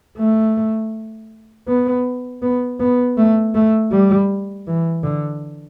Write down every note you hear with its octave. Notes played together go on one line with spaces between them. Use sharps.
A3
B3
B3
B3
A3
A3
G3
E3
D3